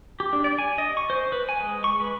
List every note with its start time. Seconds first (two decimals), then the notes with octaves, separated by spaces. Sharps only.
0.20 G4
0.33 D4
0.44 D5
0.59 G#5
0.78 D#5
0.97 C#6
1.10 C5
1.32 B4
1.49 G#5
1.60 G#3
1.84 C#6
2.00 B4